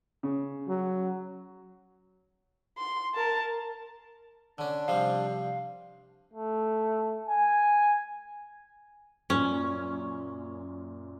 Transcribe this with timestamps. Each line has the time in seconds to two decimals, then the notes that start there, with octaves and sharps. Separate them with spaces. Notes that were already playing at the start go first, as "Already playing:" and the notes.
0.23 C#3
0.68 F#3
2.78 C6
3.15 A#4 A5
4.58 D3 C#4 D4
4.88 C3 F3 G3 F5
6.34 A3
7.29 G#5
9.30 F#2 A#2 C#4